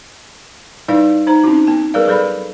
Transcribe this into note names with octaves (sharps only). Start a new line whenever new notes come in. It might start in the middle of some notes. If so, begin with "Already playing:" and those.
G3 D#4 E4 B4 D5 F5
D#4 C5 A#5
C4 C#4 D#4 E4 F#4
B3 A5
G3 G#4 A#4 B4 D5 F5
F#3 A4 B4 D5 B5